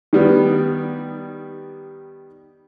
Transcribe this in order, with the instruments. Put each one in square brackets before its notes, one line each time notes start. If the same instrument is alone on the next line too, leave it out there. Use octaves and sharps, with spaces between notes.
[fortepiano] D#3 G3 B3